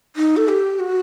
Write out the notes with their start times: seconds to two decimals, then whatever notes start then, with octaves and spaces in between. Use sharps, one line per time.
0.16 D#4
0.37 A4
0.48 G4
0.80 F#4